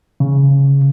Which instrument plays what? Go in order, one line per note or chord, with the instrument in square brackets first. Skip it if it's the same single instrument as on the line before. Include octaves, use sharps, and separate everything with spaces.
[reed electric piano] C#3